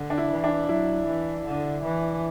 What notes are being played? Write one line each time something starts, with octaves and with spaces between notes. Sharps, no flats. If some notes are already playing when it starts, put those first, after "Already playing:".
Already playing: D3
D4
E4
E3
D4
F#3 E4
E3
D3
E3